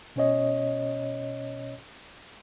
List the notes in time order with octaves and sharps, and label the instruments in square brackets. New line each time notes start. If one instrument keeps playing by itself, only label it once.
[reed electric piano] B2 C#4 C#5 D#5